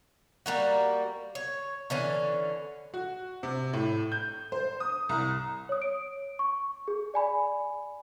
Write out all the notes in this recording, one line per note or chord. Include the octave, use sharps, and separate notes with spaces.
G3 A#3 F#4
C#5
D3 E3 C#4
F#4
C3
A2
G6
C5
D#6
C2
C#5 D#6
D7
C#6
G#4
D5 G#5 B5